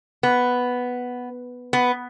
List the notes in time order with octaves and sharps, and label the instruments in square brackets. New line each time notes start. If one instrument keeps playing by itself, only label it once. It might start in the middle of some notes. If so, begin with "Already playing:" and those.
[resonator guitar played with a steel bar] B3
B3